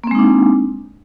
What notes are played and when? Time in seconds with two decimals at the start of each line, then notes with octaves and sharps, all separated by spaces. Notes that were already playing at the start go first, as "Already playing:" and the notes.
0.04 A#3
0.07 C4
0.11 G#3
0.15 D#4
0.19 D4